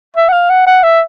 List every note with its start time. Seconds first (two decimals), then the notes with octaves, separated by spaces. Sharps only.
0.16 E5
0.29 F#5
0.33 F5
0.50 F#5
0.67 F#5
0.83 E5